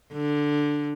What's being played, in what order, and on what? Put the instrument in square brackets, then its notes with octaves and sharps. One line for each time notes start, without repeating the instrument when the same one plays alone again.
[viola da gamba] D3